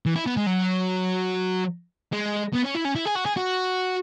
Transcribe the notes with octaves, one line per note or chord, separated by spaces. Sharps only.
E3
E4
B3
G#3
F#3
G#3
B3
C#4
E4
C#4
E4
G#4
F#4
G#4
F#4